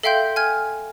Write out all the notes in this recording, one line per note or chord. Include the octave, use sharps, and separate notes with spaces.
A4 E5 F5 G5 C6 G6
G#5 F6 G#6